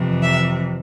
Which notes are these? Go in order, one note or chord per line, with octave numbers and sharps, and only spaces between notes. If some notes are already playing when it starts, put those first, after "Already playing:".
Already playing: F2 C3 E3
E5